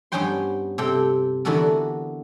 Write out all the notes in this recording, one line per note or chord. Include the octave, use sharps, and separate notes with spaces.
G2 B3 C#4 C5 G5 C6
C3 A4 G5
D3 E3 B3 F#4 A4 A#4